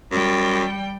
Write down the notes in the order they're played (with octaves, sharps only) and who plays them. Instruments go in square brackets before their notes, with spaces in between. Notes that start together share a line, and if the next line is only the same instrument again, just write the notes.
[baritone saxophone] F#2 [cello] G3 G5